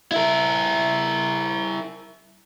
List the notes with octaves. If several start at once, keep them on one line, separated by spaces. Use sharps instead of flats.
E4 A#4